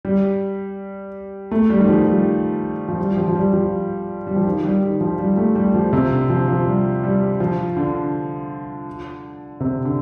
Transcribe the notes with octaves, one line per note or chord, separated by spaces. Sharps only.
G3
A3
G3
D#3
F3
G3
F3
G3
F3
F3
G3
F3
G3
F3
D#3
G3
D#3
F3
G3
A3
G3
F3
C3
D3
F3
F3
G3
G3
F3
D3
C3
D3